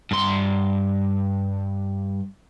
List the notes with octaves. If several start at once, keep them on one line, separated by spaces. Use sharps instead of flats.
G2 C6